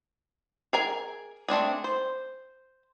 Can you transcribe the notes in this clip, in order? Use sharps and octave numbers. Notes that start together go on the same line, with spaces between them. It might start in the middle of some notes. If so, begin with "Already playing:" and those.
G#4 A#4 G#5
A3 C4 D4 G#4
C5